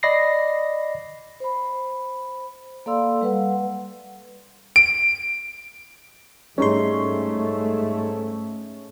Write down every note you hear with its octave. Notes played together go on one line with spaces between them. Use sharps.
D5 D#5 B5 A#6 C7
C5 B5
A#3 A4 D5 F5 C6 E6
G3 B4 F#5
D7
G#2 G3 A3 C#4 D#4 G#4 C6